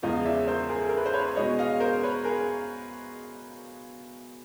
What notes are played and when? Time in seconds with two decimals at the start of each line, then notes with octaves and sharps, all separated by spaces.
0.03 E2 C#3 F3 G#3 D#5 F5
0.24 D5 E5
0.37 C#5
0.47 A#4 C5
0.69 G#4 A#4
0.80 A4
0.89 A#4
0.97 B4
1.06 C5
1.13 B4 C#5
1.36 B2 G#3 C#5 D#5
1.59 D#5 F5
1.80 A#4 C5
2.03 B4 C#5
2.25 G#4 A#4